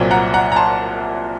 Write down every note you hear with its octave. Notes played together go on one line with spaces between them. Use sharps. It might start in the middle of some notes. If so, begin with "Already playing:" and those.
Already playing: C2 A#2 F#3 C4
F#5 A#5
F#5 A#5
A#5
A5 C6